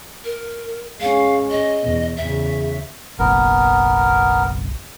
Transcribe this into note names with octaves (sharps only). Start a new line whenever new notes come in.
A#4
G#3 C#4 F5
D#5
E2 B2
E2 C#3 E5
F#1 B1 B3 A#4